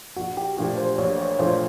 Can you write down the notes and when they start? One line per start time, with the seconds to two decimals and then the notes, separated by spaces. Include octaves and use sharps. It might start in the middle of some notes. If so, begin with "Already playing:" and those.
0.17 A#1 F#4
0.37 G4
0.57 A#2 F3 A3 D4 G4
0.78 C5
0.98 A#1 C#5
1.18 C#5
1.39 A#2 F3 A3 D4 C5